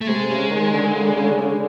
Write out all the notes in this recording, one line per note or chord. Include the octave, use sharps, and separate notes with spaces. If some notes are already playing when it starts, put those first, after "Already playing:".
A3
C3 G#3
C#3
D#3
D3
C#3
D3
C#3
D3
C#3
D3